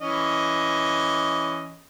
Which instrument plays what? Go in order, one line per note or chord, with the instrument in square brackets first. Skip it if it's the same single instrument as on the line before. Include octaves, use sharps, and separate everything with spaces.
[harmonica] E3 C#4 D#5